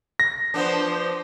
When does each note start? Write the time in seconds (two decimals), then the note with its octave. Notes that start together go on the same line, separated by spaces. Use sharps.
0.20 A#6
0.54 F3 B3 D4 C5